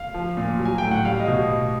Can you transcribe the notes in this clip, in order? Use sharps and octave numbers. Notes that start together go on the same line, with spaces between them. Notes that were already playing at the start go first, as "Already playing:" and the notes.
Already playing: F5
F3
A#2
F#3
G#5
A2 G5
F#5
G3 F5
D#5
B2